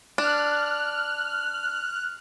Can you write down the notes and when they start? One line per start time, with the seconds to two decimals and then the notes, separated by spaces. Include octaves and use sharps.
0.18 D4 F6 F#6